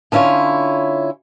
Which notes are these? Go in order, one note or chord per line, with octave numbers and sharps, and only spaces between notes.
D3 C#4 E4 F4 C#5